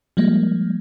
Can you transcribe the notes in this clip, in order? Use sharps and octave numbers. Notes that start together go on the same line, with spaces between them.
F3 G3 G#3 A#3